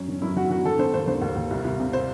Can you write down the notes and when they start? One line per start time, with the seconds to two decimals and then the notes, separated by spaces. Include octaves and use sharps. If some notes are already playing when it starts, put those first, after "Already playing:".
Already playing: F#2 C#4
0.08 D#3
0.22 F#2 E4
0.36 D#3 F#4
0.50 D#3 F#4
0.65 D#3 A4
0.79 D#3 C5
0.94 D#2 C5
1.07 D#3 C5
1.22 D#2
1.36 D#2
1.51 C2
1.64 C2
1.80 C3
1.93 C5